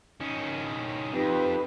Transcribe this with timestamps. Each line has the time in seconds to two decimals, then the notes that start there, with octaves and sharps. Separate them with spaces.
0.20 D#3 C#4
1.13 F2 D#4 G4 B4